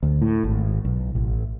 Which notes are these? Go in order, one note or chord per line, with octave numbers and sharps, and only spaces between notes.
D2
A2
G#1
B1
A1